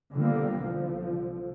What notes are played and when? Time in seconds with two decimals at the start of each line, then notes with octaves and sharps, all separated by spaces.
0.15 D3 F3 G3 A#3 B3
0.60 C2 D3 F3